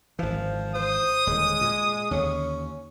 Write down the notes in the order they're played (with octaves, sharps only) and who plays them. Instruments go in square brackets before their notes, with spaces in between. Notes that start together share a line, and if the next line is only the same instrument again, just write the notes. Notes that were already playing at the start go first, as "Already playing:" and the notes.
[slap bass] G#1 E3 [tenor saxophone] F3
[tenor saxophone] C5 [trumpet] D#6
[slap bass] D#1 D3 [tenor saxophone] G#3
[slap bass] A#2
[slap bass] D#2 D3 [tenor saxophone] C#4